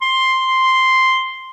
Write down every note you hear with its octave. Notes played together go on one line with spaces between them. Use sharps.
C6